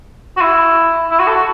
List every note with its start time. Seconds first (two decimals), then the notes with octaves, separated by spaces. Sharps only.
0.37 F#4
0.41 E4
1.10 E4
1.19 F#4
1.28 A4
1.36 F#4